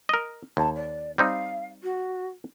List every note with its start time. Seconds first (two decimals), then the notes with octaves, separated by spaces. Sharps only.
0.09 A#4 D#5
0.57 D#2 A5
0.75 D5
1.18 G3 C4 D#4 F5
1.83 F#4